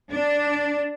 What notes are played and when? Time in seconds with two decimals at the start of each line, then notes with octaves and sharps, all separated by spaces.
0.10 D4